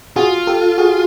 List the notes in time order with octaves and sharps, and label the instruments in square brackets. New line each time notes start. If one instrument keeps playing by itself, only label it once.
[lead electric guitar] F4 [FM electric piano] F#4 G#4
[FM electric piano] G4 A4
F#4 G#4